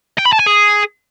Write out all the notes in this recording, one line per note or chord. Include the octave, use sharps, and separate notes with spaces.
G5
B5
A5
G#5
G#4